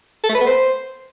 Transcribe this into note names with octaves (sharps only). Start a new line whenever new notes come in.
A4
A3
B4
B3
C5